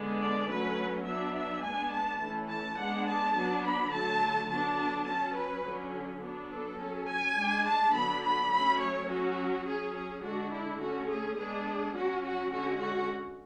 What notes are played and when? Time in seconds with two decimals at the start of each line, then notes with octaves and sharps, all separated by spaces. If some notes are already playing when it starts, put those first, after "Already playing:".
Already playing: D3 G#3 B3 D4
0.20 D5
0.49 F#3 A3 C#4 B4
1.06 F#3 B3 D4 E5
1.35 E5
1.63 G#3 B3 D4 G#5
1.92 A5
2.21 E3 A3 C#4
2.49 A5
2.78 G#3 B3 D4 F#5
3.07 A5
3.36 F#3 B3 D4
3.64 B5
3.93 D3 F#3 A3 A5
4.50 D3 F#3 B3 D4 A5
5.07 F#3 C#4 A5
5.36 B4
5.64 D3 F#3 C#4
6.22 F#3 B3 D4
6.50 A4
6.79 F#3 C#4
7.08 G#5
7.36 G#3 D4
7.65 A5
7.93 D3 F#3 B3 D4 B5
8.22 B5
8.51 F#3 A3 C#4 B5
8.79 C#5
9.08 F#3 C#4 F#4
9.65 F#3 C#4 G#4
9.94 G#4
10.22 D3 G#3 D4 F#4
10.51 E4
10.80 D3 A3 C#4 F#4
11.09 G#4
11.37 G#3 B3 D4 G#4
11.95 F#3 C#4 F#4
12.23 F#4
12.52 D3 G#3 C#4 F#4
12.81 F#4